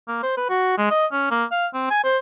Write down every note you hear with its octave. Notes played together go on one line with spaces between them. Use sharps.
A#3
C5
B4
F#4
G#3
D#5
C#4
A#3
F5
C4
G#5
C5